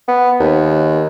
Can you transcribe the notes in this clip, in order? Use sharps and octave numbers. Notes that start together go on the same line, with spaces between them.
B3
D#2